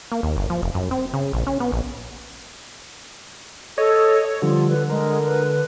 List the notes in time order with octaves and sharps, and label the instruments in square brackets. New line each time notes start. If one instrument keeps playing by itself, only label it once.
[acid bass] A#3
D#2
G1
F3
F1
F#2
C4
C#3
A#1
C#4
B3
A#1
[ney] A4 [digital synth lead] C#5 [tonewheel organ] D#5
[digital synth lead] D3 [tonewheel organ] F3 G3 [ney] F4
[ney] B4
[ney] G#3 [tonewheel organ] A#4
[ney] B4